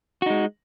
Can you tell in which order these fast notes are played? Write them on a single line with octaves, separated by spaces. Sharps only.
F#4 D#4 G#3